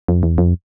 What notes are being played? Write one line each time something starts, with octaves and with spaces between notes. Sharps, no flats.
F2
E2
F2